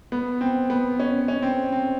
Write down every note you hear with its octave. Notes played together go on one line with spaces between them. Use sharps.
B3
C4
B3
C#4
C#4
C4
C4